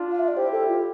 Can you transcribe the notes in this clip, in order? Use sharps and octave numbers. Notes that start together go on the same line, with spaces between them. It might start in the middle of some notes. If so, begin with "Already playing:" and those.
Already playing: D4 F4
F5
E5
D5
E4 G4 C5
A4
F4